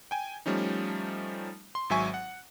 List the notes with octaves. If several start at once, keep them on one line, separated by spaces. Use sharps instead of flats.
G5 G#5
F3 G3 A3 C#4 D#4
C6
G#1 G#2 F#3 E5 G#5 C#6
F#5